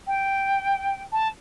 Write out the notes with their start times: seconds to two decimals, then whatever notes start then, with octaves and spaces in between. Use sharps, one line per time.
0.07 G5
1.12 A5